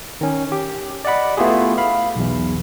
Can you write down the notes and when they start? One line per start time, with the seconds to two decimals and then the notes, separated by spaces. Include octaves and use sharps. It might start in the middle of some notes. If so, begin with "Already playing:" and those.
0.21 D#3 C#4
0.52 G4
1.05 D5 D#5 F#5 B5
1.37 A3 B3 E4 F4 G4 G#4
1.78 F5 B5
2.16 B1 E2